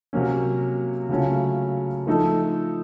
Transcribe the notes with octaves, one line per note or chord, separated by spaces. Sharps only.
C3 F#3 A#3 C#4
C#3 F#3 A3 C#4 F4
F3 A3 D#4 A4